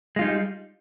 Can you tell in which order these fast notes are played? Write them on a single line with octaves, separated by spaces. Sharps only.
G#3 F4 D#4 G3